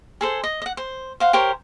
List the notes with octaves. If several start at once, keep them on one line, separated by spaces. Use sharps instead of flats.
G#4 A4 C5
D#5
D#5 F#5
C5
C5 F5 F#5
G4 A#4 C5 C#5